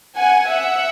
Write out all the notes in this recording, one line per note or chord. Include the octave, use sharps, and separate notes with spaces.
F#5 G#5
E5 F#5